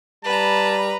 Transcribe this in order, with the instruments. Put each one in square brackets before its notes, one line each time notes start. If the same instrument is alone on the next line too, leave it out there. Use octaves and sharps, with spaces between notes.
[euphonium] G3 [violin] B4 A#5 [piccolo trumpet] A5